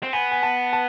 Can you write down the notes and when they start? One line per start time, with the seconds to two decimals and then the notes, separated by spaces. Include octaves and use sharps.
0.03 C4
0.13 B3 G#5
0.31 G#5
0.43 A5
0.73 A5